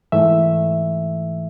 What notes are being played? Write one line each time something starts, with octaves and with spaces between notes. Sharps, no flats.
G#2 E3 A3 E5